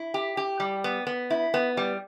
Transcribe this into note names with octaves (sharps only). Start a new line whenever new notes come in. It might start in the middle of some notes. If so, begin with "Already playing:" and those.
Already playing: E4
G4
G4
G3
B3
B3
E4
B3
G3